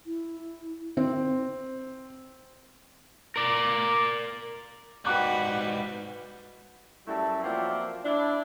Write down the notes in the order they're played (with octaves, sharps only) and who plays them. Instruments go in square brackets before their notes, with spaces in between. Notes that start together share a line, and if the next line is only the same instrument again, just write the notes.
[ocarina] E4
[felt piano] C4
[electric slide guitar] A#4 D5
[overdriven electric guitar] G#2 G3 [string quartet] F#4 B4 [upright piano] G5 D6 F#6
[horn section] F#2 G3 A3 E4 A5
F3 F#3 A#3 C4 D5 E5
D4 E4